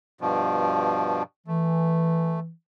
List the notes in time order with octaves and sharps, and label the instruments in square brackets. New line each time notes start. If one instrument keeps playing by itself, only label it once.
[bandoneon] G2 B2 F3
[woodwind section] E3 [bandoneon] A3